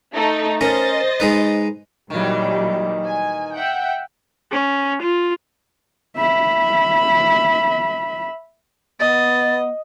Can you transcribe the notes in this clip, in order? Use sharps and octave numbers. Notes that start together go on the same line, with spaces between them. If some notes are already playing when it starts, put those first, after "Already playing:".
A3 D#4 A4
C#4 A#4 C5 D#5 A6
G#3 D#4 B4
A#2 D#3 E3 F#3 G3
G#5
E5 F#5 G5
C#4
F4
E5 B5
B3 D#5 A6